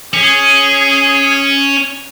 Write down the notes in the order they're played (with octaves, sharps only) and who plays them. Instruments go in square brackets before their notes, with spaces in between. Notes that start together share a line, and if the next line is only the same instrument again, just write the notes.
[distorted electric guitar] C#4 [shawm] G#4